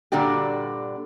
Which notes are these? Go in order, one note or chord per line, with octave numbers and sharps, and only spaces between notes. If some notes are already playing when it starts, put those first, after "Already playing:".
G2 A#2 D3 D4 F#4 G4